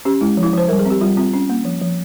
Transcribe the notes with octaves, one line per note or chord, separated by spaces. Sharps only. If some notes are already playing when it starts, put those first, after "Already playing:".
C#4 G4
G#3 E4
F3
E4
F3 C5
G3 A#4
G#4
C4 G4
G3 F4
C4 F4
C#4
A#3
F3
F3